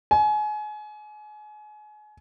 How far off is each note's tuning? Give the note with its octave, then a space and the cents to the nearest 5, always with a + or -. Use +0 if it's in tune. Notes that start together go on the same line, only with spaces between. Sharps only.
G#5 +30